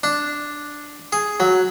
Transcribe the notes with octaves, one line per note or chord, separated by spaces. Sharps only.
D4
G#4
F#3